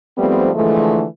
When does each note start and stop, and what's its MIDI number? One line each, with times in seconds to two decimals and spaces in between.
0.17 0.49 44
0.17 0.49 53
0.17 0.49 55
0.17 0.49 57
0.17 0.49 59
0.17 0.49 60
0.54 1.04 50
0.54 1.04 52
0.54 1.04 53
0.54 1.04 56
0.54 1.04 57